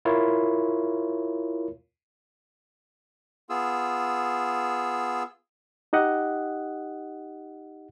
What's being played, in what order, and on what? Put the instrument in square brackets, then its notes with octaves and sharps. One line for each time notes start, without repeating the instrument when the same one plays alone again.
[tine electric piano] E4 F4 A#4 C#5
[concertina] B3 F4 G#4 E6
[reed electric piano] D#4 G4 D#5 F#5